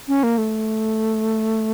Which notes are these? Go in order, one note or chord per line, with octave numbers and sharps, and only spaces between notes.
C#4
A#3
A3